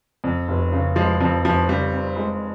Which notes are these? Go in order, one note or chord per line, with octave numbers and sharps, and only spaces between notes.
F2
F1
C#3
F1 F3 G#3
F2 F3
F1 F3
C#3 G3
C4
G#3